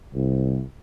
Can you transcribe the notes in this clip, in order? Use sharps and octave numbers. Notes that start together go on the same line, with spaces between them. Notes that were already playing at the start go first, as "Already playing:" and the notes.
C2